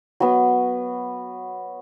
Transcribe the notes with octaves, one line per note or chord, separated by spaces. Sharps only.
F#3 B3